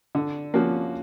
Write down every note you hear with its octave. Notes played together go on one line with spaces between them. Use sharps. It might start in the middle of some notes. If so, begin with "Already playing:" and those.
D3
F3 A#3 C#4 F#4